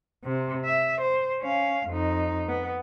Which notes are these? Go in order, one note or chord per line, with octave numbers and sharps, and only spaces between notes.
C3
E5
C5
C#4 F5
F2 D#4
B3